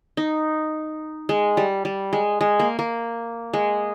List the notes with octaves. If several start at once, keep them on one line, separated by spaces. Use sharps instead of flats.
D#4
G#3
G3
G3
G#3
G#3
A#3
A#3
G#3